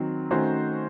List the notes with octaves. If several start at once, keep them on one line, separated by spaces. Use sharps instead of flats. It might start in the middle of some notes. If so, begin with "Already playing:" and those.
Already playing: D#3 F#3 C4
D#3 A3 C#4 F#4 C5